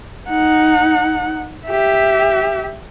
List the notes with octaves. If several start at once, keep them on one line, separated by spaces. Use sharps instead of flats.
D#4 F#5
G4 E5